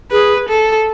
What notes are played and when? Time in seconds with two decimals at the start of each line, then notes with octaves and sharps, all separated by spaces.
0.11 G#4 B4
0.49 A4